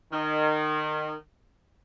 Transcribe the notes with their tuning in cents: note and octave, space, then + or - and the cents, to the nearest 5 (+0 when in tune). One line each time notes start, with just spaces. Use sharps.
D#3 -25